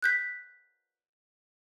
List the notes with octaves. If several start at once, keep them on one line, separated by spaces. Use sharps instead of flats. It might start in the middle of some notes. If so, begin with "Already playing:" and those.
F#6 G6 B6